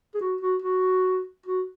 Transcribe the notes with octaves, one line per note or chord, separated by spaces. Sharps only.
G#4
F#4
F#4
F#4
F#4